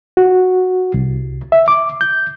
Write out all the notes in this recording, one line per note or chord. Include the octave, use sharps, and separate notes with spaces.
F#4
C2
E5
D6
G6